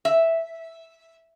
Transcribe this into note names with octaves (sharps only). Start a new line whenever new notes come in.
E5